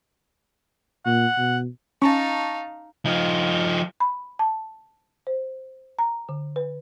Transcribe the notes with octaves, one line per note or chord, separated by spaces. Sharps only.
A#2 F#5
B2
C#4 D#4 F5 A5 A#5 C#6
F3 D#4
B5
A5
C5
A#5
D3
B4